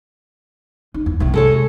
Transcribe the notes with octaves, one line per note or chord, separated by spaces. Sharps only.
D#4
E2
B1 A2 F4
C3 G#3 A4 C#5